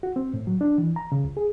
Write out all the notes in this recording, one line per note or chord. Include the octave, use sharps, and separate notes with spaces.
F#4
C4
A2
F#3
D4
E3
A#5
C#3
C#2
G#4